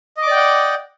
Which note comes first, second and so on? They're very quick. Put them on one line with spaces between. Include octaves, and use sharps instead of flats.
D#5 D6 D5 G5 F#5